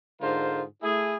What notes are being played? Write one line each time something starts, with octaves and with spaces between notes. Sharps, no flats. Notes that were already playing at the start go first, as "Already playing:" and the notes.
G#2 D3 G#3 F4 A#4 C5
A3 E4 G#4